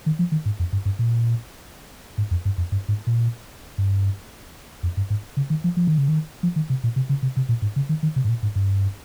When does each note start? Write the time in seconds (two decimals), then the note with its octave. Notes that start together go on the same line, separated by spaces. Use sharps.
0.06 D#3
0.19 F3
0.32 D#3
0.46 G#2
0.59 F2
0.73 G2
0.85 G2
0.99 A#2
2.18 G#2
2.31 F2
2.45 G2
2.58 F2
2.72 G2
2.88 G#2
3.07 A#2
3.78 G2
4.83 F2
4.97 G2
5.10 G#2
5.37 C#3
5.50 D#3
5.64 F3
5.77 F3
5.87 D#3
5.98 C#3
6.08 D#3
6.43 F3
6.56 D#3
6.70 C3
6.84 A#2
6.96 C3
7.09 C#3
7.23 C3
7.37 C3
7.49 A#2
7.62 G#2
7.76 C#3
7.89 D#3
8.03 D#3
8.16 C3
8.24 G#2
8.29 A#2
8.43 G#2
8.56 G2